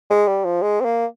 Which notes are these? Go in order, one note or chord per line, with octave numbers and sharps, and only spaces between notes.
G#3
G3
F3
G#3
C4
A#3